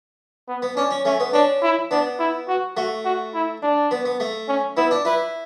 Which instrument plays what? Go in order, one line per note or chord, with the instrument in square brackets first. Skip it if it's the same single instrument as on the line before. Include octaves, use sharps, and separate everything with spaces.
[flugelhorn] B3
[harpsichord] B3
[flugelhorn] C#4 [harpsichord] D4
[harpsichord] C#4
[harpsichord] A3 [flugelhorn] C#4
[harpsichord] B3
[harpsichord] C#4 [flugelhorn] D4
[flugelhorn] E4
[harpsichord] B3 [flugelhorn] D4
[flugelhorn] E4
F#4
[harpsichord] A3 [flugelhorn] F#4
[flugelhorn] F#4
E4
D4
[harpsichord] B3
B3
A3
[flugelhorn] C#4
[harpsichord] B3 [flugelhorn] E4
[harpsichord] D4
[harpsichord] E4 [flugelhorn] B4